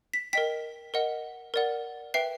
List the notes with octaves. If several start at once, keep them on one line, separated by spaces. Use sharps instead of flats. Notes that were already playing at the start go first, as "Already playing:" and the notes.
B6
A#4 D#5 G5 B6
A#4 D#5 F#5
A#4 D5 F#5
B4 E5 G5 C7